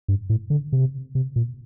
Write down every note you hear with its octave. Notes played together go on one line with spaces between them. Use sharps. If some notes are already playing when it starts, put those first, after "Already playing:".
G2
A2
D3
C3
C3
A#2